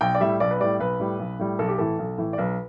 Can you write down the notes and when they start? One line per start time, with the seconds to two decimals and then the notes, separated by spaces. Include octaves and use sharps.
0.01 B1 G5
0.15 D5
0.20 A2 G3 E5
0.40 B1 D5
0.51 B4
0.60 A2 G3 D5
0.79 B1 B4
1.00 A2 G3
1.19 B1
1.39 A2 G3
1.59 B1 A4
1.68 G4
1.78 A2 E3 A4
1.99 B1
2.18 A2 E3
2.33 D5
2.38 B1 B4